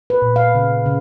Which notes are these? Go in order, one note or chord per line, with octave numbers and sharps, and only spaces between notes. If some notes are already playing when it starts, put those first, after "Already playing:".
B4
A#2
F5
C#3
C#3